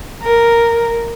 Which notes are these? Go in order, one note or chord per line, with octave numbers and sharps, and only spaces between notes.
A#4